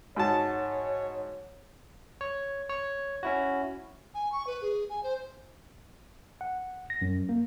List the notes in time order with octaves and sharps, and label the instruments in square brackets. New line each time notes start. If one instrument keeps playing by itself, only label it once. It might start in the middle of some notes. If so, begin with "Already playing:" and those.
[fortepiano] G#2 F#4 A5 [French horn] C#5
[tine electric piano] C#5
C#5
C#4 E4 F#4
[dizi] G#5
C#6
B4
G#4
G#5
C5
[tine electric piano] F#5
A#6
F#2
A#3